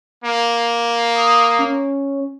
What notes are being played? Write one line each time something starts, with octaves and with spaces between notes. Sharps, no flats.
A#3
D#6
C#4